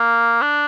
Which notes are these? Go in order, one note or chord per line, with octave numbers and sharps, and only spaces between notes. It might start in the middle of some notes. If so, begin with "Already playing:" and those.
Already playing: A#3
D4